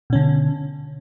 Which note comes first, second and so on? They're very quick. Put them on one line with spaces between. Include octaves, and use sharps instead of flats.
B2 C#4 D3